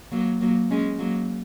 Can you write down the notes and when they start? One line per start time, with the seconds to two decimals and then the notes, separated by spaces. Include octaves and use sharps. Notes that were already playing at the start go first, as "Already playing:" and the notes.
0.12 F#3 A#3
0.41 F#3 A#3
0.71 G#3 C#4
0.99 F#3 A#3